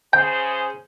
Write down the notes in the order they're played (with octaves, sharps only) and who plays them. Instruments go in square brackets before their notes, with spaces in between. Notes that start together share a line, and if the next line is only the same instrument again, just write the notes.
[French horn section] C#3 G#4 C5 [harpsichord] G5